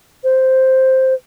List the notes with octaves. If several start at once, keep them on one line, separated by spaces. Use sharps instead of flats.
C5